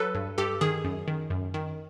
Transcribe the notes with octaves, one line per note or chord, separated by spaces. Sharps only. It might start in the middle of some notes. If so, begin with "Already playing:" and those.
Already playing: F#3 A4 B4
G2
G2 G4 A4
D#3 G#4
F#2
D#3
F#2
D#3